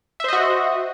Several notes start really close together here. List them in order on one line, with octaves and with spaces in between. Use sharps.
E5 C5 D#5 F#4